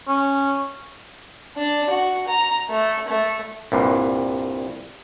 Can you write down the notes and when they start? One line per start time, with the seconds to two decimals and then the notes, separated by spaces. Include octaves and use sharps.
0.08 C#4
1.56 D4
1.90 F#4
2.28 A#5
2.69 A3
3.07 A3
3.72 C2 G2 A#2